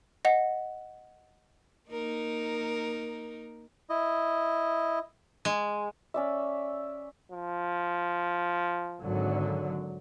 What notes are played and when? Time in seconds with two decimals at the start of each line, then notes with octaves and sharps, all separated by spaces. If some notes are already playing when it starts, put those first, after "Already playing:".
0.25 D#5 F#5
1.90 A#3 D#4 A#4
3.90 E4 D#5
5.45 G#3
6.14 C#4 D5 E5
7.32 F3
9.02 G#1 D3 F#3